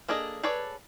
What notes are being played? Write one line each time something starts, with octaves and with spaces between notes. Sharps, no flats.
A#3 D4 G#4 A4 D#5
G#4 A4 B4 C#5 D5